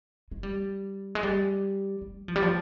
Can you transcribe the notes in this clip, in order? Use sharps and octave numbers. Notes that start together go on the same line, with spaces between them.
G#3
G3
G#3
G3
G3
F3
G3
F3